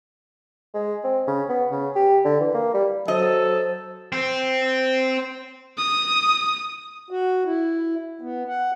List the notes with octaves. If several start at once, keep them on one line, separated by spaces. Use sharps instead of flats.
G#3
C4
C#3
B3
C#3
G4
D3
E3
A#3
G3
F#3 A4 C5 D#5
C4
D#6
F#4
E4
B3
F#5